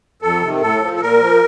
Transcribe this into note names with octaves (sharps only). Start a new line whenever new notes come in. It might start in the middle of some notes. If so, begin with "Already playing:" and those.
F2 A4
C3 D#3
A2 A4
F3
A4
A#2 A#4
F3